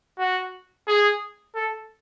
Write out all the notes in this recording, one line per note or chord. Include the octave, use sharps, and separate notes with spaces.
F#4
G#4
A4